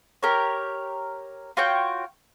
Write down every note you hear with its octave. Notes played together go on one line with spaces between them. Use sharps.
G4 A#4 C#5
F4 F#4 C#5 G5